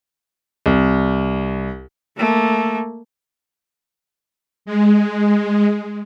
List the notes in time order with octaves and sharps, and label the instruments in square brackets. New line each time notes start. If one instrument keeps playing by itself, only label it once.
[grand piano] C2
[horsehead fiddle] A3 A#3
[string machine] G#3